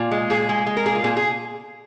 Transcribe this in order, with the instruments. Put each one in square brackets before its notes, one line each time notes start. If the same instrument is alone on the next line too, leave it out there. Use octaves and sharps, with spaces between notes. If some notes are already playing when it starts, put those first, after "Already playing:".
Already playing: [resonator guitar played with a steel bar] A#2 F4
G#3
A#2 G#4
G#3
G#3
A#4
A#2 G#4
F4
A#2 G#4
G#4